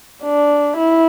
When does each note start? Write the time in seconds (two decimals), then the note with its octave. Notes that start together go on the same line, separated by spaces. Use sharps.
0.24 D4
0.77 E4